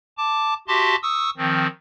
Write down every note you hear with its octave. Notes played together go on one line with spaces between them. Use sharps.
A5 D6
F#4 G4 E5 A5 C6 D6
C#6 D#6 E6
D#3 F3 C4